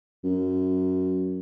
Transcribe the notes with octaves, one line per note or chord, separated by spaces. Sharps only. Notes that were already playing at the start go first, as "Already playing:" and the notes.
F#2